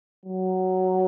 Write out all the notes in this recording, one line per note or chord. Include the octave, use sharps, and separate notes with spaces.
F#3